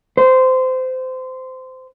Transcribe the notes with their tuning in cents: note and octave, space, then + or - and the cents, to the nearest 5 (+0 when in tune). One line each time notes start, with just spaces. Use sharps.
C5 -20